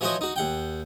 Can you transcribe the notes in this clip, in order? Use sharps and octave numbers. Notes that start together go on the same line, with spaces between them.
E3 F3 F#4 C5 C#5 D#5
D#4 F#4
D#2 F#5 G5